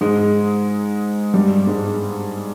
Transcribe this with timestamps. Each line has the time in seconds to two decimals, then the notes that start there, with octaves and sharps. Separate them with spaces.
0.01 G#2 G#3
1.34 G2 G3
1.67 G#2 G#3